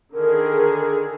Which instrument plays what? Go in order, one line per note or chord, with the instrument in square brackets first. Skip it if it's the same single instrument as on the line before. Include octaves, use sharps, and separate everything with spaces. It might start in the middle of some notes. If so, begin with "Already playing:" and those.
[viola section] D3 D#3 G#4 [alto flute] A#4